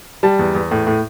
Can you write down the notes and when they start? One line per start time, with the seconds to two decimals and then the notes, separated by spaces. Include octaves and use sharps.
0.23 G3 A5
0.39 E2
0.55 E2
0.71 A2
0.87 A2